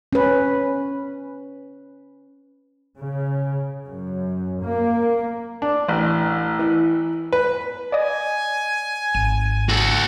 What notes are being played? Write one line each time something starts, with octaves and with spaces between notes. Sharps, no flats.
C#4 B4
C#3
F#2
A#3
D4
A1
E3
B4
D5 D#5 G#5
G#1 D#7
F#4 A4